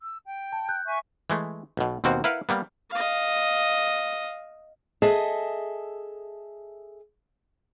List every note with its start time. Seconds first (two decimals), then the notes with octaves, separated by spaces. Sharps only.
0.01 E6
0.24 G5
0.52 A5
0.69 F#6 G6
0.86 E5 G#5 C#6
1.30 E3 G#3 A3
1.77 B1 B2
2.04 D#2 B2 A#3 C4 F#4
2.24 E4 A#4 B4 F5 F#5
2.49 G3 A#3 B3
2.90 D#5 F5
5.02 G#4 A4 D#5 E5 A5